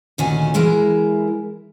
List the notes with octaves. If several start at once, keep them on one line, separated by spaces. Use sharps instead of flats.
D2 A#2 D#3 C#4 F#4 G#5
E3 G#3 E4 A#4